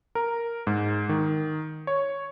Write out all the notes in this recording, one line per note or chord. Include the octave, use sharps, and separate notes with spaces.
A#4
G#2
D#3
C#5